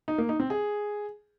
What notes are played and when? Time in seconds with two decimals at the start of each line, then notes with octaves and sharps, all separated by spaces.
0.08 D#4
0.18 A#3
0.29 D#4
0.40 C4
0.50 G#4